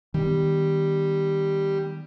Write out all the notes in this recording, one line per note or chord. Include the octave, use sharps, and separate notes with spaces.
D#3 G3 B3